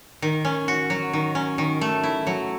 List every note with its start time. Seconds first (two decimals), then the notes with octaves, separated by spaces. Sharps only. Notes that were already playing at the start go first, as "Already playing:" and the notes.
0.22 D#3
0.45 C#4
0.68 F#4
0.90 F#3
1.13 D#3
1.35 C#4
1.58 D#3
1.81 A3
2.03 E4
2.27 F#3